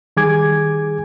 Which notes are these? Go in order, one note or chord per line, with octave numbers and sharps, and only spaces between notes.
D#3 G3 G#4 G#5 D6 G#6